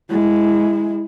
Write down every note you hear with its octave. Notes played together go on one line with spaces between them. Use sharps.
G#3 E4